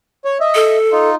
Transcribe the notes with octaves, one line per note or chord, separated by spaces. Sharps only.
C#5
D#5 E5
A4
D#4 F4